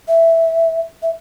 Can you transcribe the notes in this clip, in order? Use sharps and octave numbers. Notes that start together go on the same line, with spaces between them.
E5
E5